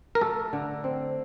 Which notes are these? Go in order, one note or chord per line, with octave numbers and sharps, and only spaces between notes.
A#4
A3 A4
D3
C4